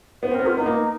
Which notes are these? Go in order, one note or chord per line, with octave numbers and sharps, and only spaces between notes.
B3 C5
C4 A#4
B3
F4
B3 D#4
A#3